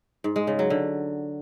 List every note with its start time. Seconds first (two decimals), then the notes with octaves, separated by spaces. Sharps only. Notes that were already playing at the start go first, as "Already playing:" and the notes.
0.24 G#2
0.36 G#3
0.47 C#3
0.59 F#3
0.70 D3